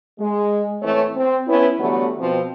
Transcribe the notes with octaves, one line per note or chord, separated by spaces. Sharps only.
G#3
A2 E3 A3 C4 C#5
C4
B3 C#4 E4
D3 E3 F#3 G3 A3 B3
B2 F3 C4